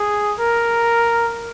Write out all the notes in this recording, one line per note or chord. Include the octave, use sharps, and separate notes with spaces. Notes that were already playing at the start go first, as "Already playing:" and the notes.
Already playing: G#4
A#4